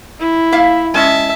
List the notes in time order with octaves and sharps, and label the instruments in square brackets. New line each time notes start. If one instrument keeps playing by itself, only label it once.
[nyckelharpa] E4
[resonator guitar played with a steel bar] A#3 E5 F5
[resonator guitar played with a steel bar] G#3 C#4 D#5 [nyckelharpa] E5 A5